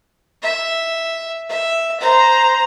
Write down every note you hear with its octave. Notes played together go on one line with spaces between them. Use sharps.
E5
E5
C5 A#5